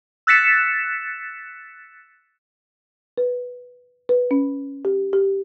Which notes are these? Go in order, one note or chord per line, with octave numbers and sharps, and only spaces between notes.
E6 F#6 A6 B6 C#7 E7
B4
B4
C#4
G4
G4